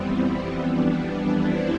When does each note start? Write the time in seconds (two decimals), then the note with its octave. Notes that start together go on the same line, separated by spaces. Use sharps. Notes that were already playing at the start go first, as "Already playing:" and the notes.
Already playing: F2 E3 G3 B3 C4
0.63 F2 E3 G3 B3 D4
0.99 B3 D4
1.34 C4 E4